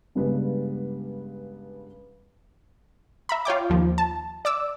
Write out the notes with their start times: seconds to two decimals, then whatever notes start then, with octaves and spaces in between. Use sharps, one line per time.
0.15 G2 C#3 G3 G#3 B3
3.29 E5 A#5 B5
3.45 F4 C#5 G5 D6
3.70 D#2 F3
3.98 A5
4.45 D5 D6 E6